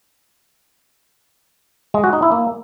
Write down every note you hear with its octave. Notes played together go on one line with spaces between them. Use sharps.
G#3
F#4
D#4
E4
A#3